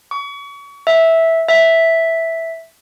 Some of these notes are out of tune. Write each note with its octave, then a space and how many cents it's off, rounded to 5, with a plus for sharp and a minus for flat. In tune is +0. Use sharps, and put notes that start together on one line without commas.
C#6 +35
E5 -10
E5 -5